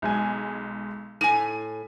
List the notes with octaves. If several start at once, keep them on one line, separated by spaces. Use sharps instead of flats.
B1 G#3 G#5
A2 G#5 D#7